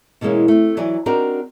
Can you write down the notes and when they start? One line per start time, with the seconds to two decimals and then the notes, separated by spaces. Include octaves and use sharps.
0.21 B2 E3 G#3 A#3 C#4
0.48 A3 C4
0.77 E3 F#3 D5 G#5
1.06 C4 D4 D#4 F#4 G4 A#4